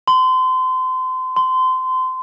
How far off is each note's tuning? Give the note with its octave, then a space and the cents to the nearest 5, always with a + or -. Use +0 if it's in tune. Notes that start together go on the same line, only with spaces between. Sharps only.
C6 -30
C6 -25